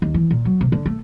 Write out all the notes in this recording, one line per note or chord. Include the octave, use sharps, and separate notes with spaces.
D#2
E3
A#2
F#3
C3
D3
A3